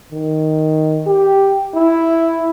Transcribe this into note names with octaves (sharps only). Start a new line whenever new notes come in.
D#3
G4
E4